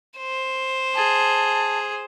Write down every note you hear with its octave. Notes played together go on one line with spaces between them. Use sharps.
C5
G#4 A5